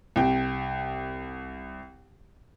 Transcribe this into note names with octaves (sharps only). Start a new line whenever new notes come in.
C2 G5